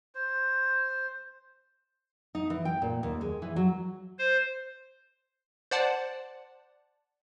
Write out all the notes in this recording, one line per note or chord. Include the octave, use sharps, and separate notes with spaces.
C5
D#4
E3
G5
A#2
D#2
G#3
E3
F#3
C5
C5 D5 F#5 A5